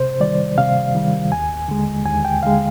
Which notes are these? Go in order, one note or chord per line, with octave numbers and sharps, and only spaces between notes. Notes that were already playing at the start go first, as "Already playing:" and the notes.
Already playing: C3 C5
D#3 G3 D5
C3 F5
D#3 G3
D#2 G#5
D3 G#3
D#2 G#5
G5
D3 G#3 F5